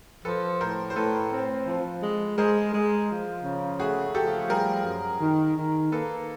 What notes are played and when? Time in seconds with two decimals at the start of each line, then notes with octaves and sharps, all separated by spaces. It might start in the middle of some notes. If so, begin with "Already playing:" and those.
0.25 F3 A4 B4
0.60 A2 A#4 C5
0.90 C5
0.96 A2 A4 B4
1.31 C4
1.67 F3
2.02 G#3
2.38 G#3 A#4 C5
2.73 G#3
3.09 F3
3.44 C#3
3.79 A3 F#4 G#4
4.15 F3 G4 A4
4.50 G3 G#4 A#4
4.85 F#2
5.21 D#3
5.57 D#3
5.92 A#3 A4 B4